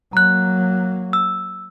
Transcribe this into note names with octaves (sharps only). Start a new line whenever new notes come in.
F#3 A#3 A#5 F#6
E6